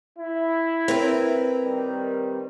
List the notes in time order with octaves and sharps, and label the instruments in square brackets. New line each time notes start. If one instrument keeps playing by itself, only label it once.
[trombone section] E4
[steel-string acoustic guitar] C4 A#4 B4
[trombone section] D#3 G3